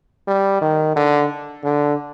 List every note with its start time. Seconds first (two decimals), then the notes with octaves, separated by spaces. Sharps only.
0.28 G3
0.62 D#3
0.96 D3
1.64 D3